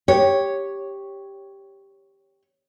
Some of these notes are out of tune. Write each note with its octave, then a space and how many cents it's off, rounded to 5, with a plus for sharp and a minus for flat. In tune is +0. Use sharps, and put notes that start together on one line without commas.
G4 +0 C#5 +0